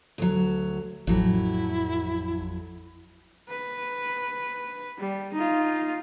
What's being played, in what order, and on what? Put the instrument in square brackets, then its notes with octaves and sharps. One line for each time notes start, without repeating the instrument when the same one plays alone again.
[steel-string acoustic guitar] D2 F#3
[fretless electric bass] A1 [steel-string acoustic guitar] F2 F#3 [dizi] E4
[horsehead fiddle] B4
G3
D#4 F4